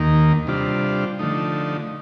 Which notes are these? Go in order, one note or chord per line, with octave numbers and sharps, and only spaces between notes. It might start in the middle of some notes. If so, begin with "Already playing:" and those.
Already playing: D#2 D#3 A#3
C3 G3 D4 F4
D3 F3 A3 D#4